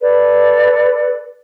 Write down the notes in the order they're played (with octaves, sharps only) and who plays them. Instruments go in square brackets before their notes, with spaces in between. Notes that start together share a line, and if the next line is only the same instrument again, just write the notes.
[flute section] A4 B4 D5